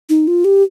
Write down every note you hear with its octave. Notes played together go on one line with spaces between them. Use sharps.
D#4
F4
G4